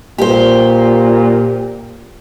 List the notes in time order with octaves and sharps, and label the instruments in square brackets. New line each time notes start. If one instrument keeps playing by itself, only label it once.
[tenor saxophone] A#2 [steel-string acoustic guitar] G4 C5